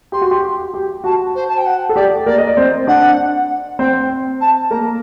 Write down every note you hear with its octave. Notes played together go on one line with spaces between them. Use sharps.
G4 C6
F#4
G4
G4
F#4 A5
C5
A5
G5
F#5
A4
G4 D5
A#3 A#4 D5
D#5
D5
C4 C5
D4 D5 F#5
C4 C5 G5
A5
A#3 A#4 A#5